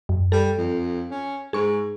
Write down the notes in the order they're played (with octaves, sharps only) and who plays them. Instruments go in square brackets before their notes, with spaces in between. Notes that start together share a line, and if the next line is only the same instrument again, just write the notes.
[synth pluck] F#2
[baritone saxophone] G3 [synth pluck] A4
[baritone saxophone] F2
C#4
[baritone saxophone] G#2 [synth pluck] G#4 C#6